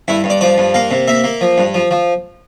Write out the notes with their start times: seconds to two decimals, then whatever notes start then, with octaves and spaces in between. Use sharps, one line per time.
0.08 G2 E4
0.24 G2
0.30 D5
0.41 F3 D5
0.58 G2
0.74 A#3 F5
0.91 C3
1.08 A#3 E5
1.24 A#3
1.41 F3
1.58 G2
1.74 F3
1.91 F3